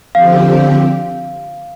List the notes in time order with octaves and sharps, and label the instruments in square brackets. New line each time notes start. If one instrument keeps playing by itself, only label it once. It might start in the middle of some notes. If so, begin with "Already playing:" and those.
[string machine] D3 F3 C4 G4 [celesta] F5